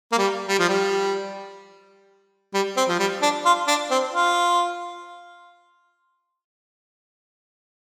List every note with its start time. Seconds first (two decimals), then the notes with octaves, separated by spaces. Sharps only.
0.12 A#3
0.18 G3
0.48 G3
0.59 F3
0.69 G3
2.54 G3
2.77 C4
2.89 F3
2.99 G3
3.22 D4
3.45 F4
3.68 D4
3.91 C4
4.13 F4